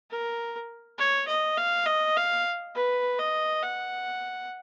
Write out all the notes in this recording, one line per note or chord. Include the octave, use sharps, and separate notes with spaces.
A#4
C#5
D#5
F5
D#5
F5
B4
D#5
F#5